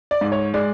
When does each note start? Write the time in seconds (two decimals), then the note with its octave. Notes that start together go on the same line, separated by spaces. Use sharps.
0.11 D5
0.21 G#2
0.32 C#5
0.54 G#3 D5